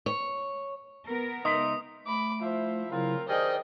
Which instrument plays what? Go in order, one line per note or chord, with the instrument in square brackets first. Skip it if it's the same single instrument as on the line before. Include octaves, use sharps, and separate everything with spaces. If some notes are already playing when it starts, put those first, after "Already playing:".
[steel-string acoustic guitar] C#5
[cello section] B3 A#4
[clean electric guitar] C#2 E5 C6 [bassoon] D#4 [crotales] D#6
[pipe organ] A3 [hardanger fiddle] B5 D6
[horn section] F3 E4 E5 [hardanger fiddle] C5
[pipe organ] C#3 F#3 E4 [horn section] C4 F4 [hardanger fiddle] A#4
[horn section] D#3 G4 G#4 [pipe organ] C5 D5 F6 [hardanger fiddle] D#5 G5